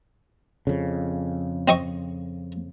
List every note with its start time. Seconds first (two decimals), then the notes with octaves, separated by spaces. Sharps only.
0.67 F2 C#3
1.68 C4 D#5 C#6